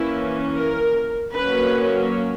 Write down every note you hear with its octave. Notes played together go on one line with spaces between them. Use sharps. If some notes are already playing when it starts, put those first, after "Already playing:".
Already playing: E3 A#3 C#4 E4
A#4
F#3 A#3 C#4 B4